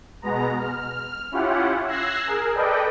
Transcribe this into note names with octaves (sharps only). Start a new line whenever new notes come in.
B2 G#3 B3 A#5
F6
C#4 E4 F4 G4 F#5
E6 F#6 G#6 A#6 C7
G#4 A#4
A4 B4 D5 D#5 G5